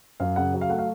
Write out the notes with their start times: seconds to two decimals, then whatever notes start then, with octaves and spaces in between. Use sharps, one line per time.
0.20 F#2 F5
0.36 C#3 F#5
0.54 F#3
0.61 F5
0.69 A3 F#5
0.79 F5